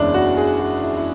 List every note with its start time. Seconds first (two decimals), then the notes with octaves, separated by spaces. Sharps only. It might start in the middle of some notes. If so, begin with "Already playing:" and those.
Already playing: F#1 E2 E3 G#3 C#4 D4
0.14 F#4
0.37 G#4
0.59 F#4
0.83 E4
0.97 E4